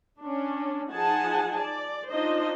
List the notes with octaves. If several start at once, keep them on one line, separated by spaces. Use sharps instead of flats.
C#4 D4
F3 D#4 G#4 F#5 G#5 A5
D5
D4 D#4 F4 C5 D#5